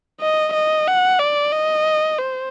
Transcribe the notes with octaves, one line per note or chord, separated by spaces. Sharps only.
D#5
D#5
F#5
D5
D#5
C5